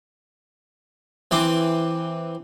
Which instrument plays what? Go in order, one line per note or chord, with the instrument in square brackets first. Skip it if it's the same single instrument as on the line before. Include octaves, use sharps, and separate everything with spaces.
[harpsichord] E3 C4 C6 D6